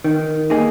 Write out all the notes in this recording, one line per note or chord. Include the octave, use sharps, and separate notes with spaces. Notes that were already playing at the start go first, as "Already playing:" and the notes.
D#3
A#3 D#4 G#4